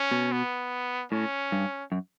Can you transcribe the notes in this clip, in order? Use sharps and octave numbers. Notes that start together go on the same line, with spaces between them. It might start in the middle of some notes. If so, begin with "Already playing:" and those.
Already playing: C#4
B2
B3
A2 C#4
G2
F#2